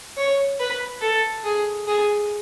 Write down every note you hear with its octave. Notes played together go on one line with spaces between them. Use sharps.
C#5
B4
A4
G#4
G#4